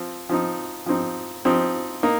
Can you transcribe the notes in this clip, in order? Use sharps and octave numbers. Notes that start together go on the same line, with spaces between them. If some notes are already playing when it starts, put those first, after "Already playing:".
Already playing: F3 C4
F3 C4 D#4
F3 C4 D#4
F3 C4 D#4
A#3 D#4